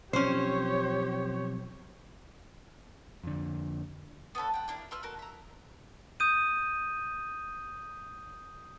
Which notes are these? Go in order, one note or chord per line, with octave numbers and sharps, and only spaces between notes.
B1 F3 C4 C#4 G4 C5 C#5
F2 D3
B3 C#4 A4 B5
F#5 G5
A#3 D4 E4 A#4
F4 B4 E6 F6
F#4 A4 A#4
E5 A#5
D#6 G6 D#7